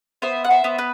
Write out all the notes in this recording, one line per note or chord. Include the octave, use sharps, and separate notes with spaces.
B3 C5 E5
F#5
C5 E5
B3
B4